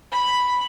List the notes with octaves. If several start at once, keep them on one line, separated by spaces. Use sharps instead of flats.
B5